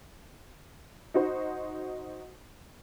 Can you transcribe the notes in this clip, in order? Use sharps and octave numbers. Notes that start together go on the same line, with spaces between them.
D#4 F#4 C5